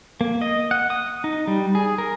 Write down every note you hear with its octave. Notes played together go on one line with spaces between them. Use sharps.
A#3
D#5
F#5
D#6
D#4
G3
G#4
A#4